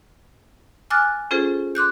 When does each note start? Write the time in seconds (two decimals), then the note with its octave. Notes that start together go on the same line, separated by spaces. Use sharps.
0.90 G#5 D6 F6 F#6 A6
1.31 C#4 F4 G#4 A4 C5
1.75 C6 D6 F#6 G6